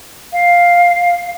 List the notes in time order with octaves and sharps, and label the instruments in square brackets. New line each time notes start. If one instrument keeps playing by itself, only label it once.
[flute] F5